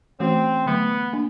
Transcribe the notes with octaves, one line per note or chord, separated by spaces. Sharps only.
E3 A3 C4 C#4 F#4
D3 F#3 A3 B3
A#3 D4